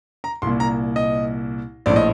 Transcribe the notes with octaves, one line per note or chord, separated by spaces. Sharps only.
A#5
C2 A#2 C6
A#5
D#5
A#1 A2 D5
D#5